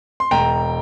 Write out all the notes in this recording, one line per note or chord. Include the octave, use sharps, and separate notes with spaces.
C6
E1 G5 A#5